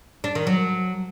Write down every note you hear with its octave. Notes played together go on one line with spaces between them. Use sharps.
D4
D#3
F#3